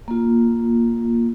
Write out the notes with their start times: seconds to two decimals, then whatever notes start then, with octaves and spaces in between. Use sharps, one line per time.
0.08 A#3 F4